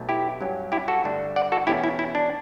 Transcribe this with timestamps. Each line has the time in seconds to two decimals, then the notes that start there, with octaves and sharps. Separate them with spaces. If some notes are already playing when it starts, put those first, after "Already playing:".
Already playing: B1 B2 A3
0.09 E4 G4
0.41 G2 F#3 C#4
0.72 E4 G4
0.88 F#4 A4
1.04 G2 D3 A3 D4
1.36 D5 F#5
1.52 F#4 A4
1.67 E2 B2 A3 C#4 E4 G4
1.84 E4
1.99 E4
2.15 D4